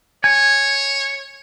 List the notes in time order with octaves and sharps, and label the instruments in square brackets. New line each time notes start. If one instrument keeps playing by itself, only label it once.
[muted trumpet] C#5 [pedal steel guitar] G#5